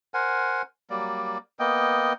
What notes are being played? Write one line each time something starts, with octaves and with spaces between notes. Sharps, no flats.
A#4 C5 F#5 G#5
F#3 G3 A#3 D5
A#3 B3 D#5 G5